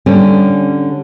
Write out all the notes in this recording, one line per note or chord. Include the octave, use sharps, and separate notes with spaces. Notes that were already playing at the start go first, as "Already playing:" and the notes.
D3 G3 C#4